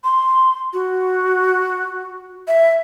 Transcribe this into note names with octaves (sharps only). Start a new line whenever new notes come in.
C6
F#4
E5